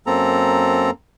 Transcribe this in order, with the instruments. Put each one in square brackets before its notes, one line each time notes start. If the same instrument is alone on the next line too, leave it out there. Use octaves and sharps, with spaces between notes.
[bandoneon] F#2 A#3 C4 A4 A#5